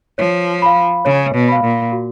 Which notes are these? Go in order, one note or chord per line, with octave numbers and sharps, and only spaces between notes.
F3 C#5
F5 B5
C#3 C#5
B2
F5 B5
A#2
F#4